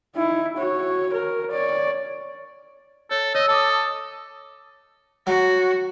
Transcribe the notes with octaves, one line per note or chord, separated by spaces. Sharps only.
D#4 E4
F#4 C#5
A#4
C#5 D5
A4 C#5
C#5 D#5 E6
A4 A5 D6 D#6
F#3 F#4